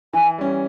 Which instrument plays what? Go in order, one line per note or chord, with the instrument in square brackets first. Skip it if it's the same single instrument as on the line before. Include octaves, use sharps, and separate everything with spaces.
[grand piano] E3 [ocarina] G#5
[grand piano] G3 C#4